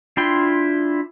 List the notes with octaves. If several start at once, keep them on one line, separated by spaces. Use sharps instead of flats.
D4 E4 F4 G5 C6